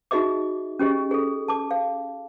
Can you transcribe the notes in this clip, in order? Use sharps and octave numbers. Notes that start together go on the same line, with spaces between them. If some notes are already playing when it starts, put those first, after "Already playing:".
D#4 F#4 G#4 D#5 E5 D6
C#4 G4 G#4 D#5
G#4 A4
A5 D6
F5